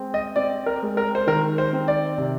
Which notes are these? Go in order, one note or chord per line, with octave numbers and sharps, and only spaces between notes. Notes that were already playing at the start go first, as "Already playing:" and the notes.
Already playing: G#3 C4
D#5
C4 D5
A#4
G#3
A#4
C5
D#3 A#4
C5
C4
D5
C3